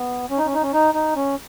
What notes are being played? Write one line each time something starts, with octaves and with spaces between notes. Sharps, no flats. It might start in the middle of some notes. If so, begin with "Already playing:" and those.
Already playing: B3
C#4
D#4
C#4
D#4
C#4
D#4
D#4
C#4